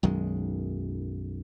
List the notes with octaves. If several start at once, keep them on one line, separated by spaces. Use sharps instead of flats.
B1 F#2 D#3 G#3